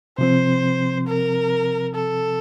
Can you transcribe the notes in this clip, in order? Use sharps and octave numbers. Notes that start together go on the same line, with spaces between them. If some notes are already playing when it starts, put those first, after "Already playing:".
C3 F3 C4 C5
A#4
A4